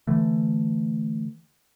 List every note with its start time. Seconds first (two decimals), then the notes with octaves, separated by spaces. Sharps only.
0.07 D3 E3 A3